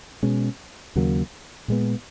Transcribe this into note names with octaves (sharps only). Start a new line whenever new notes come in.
B2 G#3 C#4
D#2 C#3 F#3 A#3
A#2 G#3 B3